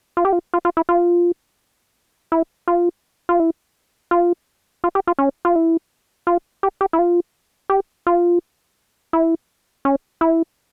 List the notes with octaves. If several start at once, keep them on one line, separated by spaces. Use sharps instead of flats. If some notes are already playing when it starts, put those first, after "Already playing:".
F4
G4
F4
F4
F4
E4
F4
E4
F4
F4
E4
F4
F4
G4
F4
C#4
F4
E4
F4
G4
G4
E4
F4
G4
F4
E4
C#4
E4